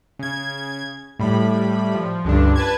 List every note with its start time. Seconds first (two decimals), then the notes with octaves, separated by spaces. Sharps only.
0.19 C#3 G#6
1.19 A2 G3 B5
1.94 F3
2.25 C#2 G2 D3 D4
2.56 B4 A5 G#6